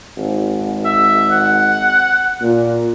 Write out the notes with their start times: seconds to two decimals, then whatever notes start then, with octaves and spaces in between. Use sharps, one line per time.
0.17 G#1
0.85 E5
1.31 F#5
2.41 A#2